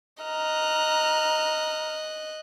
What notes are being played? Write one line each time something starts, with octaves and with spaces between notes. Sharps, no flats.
D#5 A#5 F6 F#6